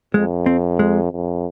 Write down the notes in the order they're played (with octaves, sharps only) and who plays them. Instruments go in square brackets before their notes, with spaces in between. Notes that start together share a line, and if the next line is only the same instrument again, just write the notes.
[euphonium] F2 [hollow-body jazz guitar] G#3
[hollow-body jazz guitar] C4
G#3
[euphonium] F2